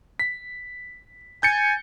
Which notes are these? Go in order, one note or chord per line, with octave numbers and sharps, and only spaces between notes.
B6
G#5 G6 A6 C#7